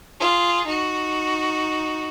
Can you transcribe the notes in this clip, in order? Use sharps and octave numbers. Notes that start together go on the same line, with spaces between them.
F4 G#4
D#4 F#4